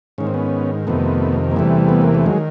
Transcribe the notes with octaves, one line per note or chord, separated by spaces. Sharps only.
G#2 D#3 C#4
C4
B3 C#4
F2 C3 D#3 A3 B3
A#3
E2 C3 E3 G3 A3
B3
A#3
A3
D#3 F#3 G#3